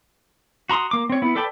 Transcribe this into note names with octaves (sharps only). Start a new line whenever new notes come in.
F#4 A#5 C6 D#6
A#3 D6
C4 C#5
B3 E4
A4 B4 D5 G5 A5